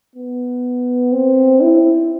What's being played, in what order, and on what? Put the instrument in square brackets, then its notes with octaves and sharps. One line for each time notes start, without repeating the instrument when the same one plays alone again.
[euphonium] B3
C4
E4